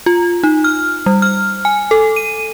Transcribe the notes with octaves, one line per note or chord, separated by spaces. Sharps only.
F4
D#4
F6
G3
F6
G#5
A4
D#7